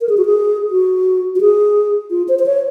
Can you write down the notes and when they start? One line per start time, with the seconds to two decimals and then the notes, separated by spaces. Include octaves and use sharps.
0.01 A#4
0.09 G#4
0.17 F#4
0.25 G#4
0.71 F#4
1.35 F#4
1.41 G#4
2.11 F4
2.28 C5
2.39 C5
2.46 C#5